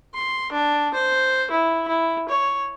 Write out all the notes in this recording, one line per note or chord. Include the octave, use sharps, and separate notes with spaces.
C6
D4
C5
E4
E4
C#5